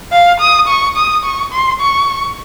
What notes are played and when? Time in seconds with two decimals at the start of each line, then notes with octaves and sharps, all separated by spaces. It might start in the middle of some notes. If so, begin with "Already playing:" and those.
0.12 F5
0.40 D#6
0.68 C#6
0.97 D#6
1.24 C#6
1.52 C6
1.81 C#6